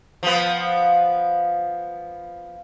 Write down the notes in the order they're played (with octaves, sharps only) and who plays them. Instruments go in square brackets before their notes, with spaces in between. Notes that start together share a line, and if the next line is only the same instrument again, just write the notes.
[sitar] F3 B3